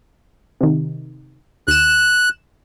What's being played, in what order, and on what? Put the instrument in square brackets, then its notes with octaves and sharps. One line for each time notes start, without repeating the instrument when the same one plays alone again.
[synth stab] C3 D#3
[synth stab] D#2 E7 [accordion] F#6